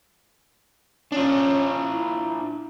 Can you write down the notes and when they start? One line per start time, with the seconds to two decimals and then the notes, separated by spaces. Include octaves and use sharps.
1.12 C#4 D4 F4
1.81 E4